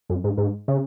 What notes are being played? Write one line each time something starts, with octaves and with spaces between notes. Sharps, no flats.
F#2
G#2
G#2
C#3